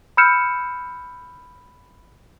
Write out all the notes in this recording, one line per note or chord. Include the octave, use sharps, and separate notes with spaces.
B5 E6 F6 G6 C#7 E7